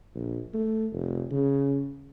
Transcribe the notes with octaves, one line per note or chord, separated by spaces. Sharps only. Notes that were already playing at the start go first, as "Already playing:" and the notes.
A#1
A3
F1
C#3